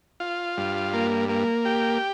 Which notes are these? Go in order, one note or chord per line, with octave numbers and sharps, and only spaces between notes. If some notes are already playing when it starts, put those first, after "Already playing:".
F4
G2
A#3
A#3
G4